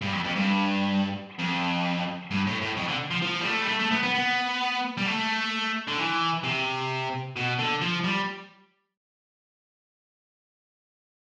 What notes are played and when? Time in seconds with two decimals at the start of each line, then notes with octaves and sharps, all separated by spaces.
0.02 G2
0.13 F2
0.24 F2
0.36 G2
1.39 F2
2.31 G2
2.47 A2
2.61 A2
2.77 F2
2.88 D3
3.11 F3
3.22 F3
3.41 G3
3.46 A3
3.62 G3
3.69 A3
3.80 A3
3.92 B3
4.03 B3
4.15 B3
4.97 G3
5.06 A3
5.88 D3
5.98 E3
6.44 C3
7.36 B2
7.59 D3
7.82 F3
8.04 G3